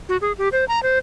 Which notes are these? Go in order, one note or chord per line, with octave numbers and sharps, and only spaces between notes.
F#4
G#4
G4
C5
A#5
C5